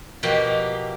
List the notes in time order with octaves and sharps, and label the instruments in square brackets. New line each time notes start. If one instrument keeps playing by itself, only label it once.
[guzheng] B2 F3 A#3 G4 G5